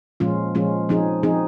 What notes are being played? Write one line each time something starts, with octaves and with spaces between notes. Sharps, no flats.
A#2 F3 G#3 C#4 F4
A#2 F3 G#3 C#4 F4
F3 C4 D#4 G#4
F3 C4 D#4 G#4